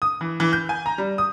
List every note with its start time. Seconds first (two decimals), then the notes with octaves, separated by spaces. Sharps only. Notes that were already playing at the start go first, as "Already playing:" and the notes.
0.02 D#6
0.21 E3
0.40 E3
0.53 G6
0.69 G#5
0.86 A#5
0.98 G3
1.18 D#6